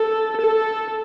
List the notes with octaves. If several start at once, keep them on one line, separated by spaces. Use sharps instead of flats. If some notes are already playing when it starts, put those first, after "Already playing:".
Already playing: A4
A4